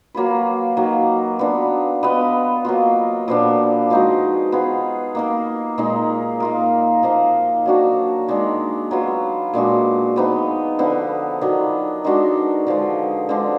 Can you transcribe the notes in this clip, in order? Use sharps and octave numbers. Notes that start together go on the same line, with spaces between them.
F#3 A#3 F4 B4
D#3 F#3 A#3
B3 D4 F4 A#4
B3 F4 B4 D#5
F#3 A#3 F4
A#2 F3 B3 D4
F3 G#3 D#4 F#4
B3 F4 G#4
A#3 D#4 A#4
A#2 G#3 D#4
A#3 F4 A#4
F3 A#3 D#4
F#3 D4 F#4
D#3 G#3 D4
F#3 B3 F4
A#2 G#3 D4 F#4
F3 B3 D#4
D3 F3 B3
D#3 F#3 D4
D#3 G#3 D4 F#4
D3 F3 G#3
D3 F3 G#3 D4